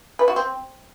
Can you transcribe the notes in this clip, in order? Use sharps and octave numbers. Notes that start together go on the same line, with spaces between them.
B4
F#4
C4